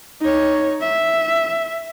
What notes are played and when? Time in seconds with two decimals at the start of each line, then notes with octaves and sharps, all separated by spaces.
0.21 D#4 C#5
0.81 E5